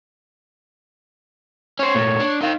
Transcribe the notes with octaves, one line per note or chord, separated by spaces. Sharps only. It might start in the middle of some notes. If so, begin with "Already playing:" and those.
C#4 C5 C#5
A#2 A3
D4
D#2 C4 D#4 F5